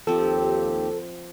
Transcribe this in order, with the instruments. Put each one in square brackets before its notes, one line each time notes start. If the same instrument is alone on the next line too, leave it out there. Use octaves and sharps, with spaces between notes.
[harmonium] D#2 G4 [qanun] F3 C4 [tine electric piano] A4